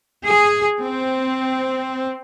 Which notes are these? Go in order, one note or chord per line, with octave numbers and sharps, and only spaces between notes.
G#4
C4